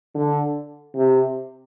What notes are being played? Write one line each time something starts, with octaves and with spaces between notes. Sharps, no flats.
D3
C3